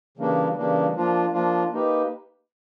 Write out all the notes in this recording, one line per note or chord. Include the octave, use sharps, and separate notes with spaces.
C#3 E3 G3 A#3 D4
C#3 E3 G3 A#3 D4
F3 A#3 D4 F4
F3 A#3 D4 F4
A#3 D#4 G4 B4